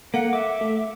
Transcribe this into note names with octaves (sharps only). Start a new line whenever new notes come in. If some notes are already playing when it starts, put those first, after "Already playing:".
A#3 A4 F5 F#5 C#7
E5 D6
A3